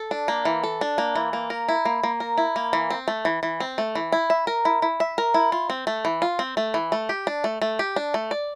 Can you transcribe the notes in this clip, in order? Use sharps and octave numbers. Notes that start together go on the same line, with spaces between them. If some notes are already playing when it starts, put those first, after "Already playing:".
Already playing: A4
D4
A#3
E3
A4
D4
A#3
E3
A#3
A#4
E4
A#3
A#3
A#4
E4
A#3
E3
C4
A3
E3
E3
C4
A3
E3
E4
E5
A#4
E4
E4
E5
A#4
E4
F4
C4
A3
E3
F4
C4
A3
E3
A3
G4
D4
A3
A3
G4
D4
A3
D5